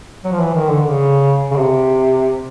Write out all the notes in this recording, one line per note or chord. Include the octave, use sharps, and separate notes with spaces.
F#3
F3
E3
D#3
D3
C#3
C#3
C3